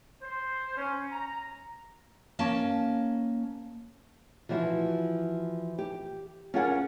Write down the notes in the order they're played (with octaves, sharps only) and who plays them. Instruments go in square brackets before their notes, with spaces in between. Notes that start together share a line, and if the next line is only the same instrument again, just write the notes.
[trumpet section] C5
C#4
A#5
[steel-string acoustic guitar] A#3 C#4 A5
[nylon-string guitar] E3 F3 E4 F#4
G4
C#4 D4 F4 G#4 A#4 F#5